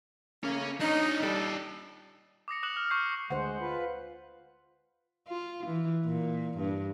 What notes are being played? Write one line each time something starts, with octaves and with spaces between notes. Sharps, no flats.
C#3 A3 A#3 C#4
D4 D#4 C#5
G3 D#4 A4 D5
D6 D#6 A#6 C#7
D6 D#6 F#6 E7 F#7
F6
C#6 G6 C7
D2 G#3 C5 F#5
F4 B4
F4
E3
A#2
G2